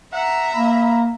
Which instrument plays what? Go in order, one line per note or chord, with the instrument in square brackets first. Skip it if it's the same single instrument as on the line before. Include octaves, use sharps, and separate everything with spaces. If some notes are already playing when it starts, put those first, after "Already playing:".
[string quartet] E5 A#5 [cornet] F#5
[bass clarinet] A#3 [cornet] B5